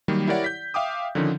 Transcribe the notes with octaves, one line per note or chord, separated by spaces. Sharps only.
D#3 F#3 G3 A#3
E4 G4 A#4 C#5 D5 F#5
G6 B6
E5 F5 G5 D6 D#6
D3 D#3 F3 C#4 D#4